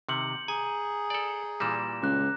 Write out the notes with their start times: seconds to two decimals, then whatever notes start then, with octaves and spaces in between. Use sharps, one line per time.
0.09 C3 D#3 G6 C#7 F#7
0.48 G#4 G#5 A#5
1.10 A4 D5
1.60 A#2 E3 G3 A#6 E7
2.02 C#2 D6 F#6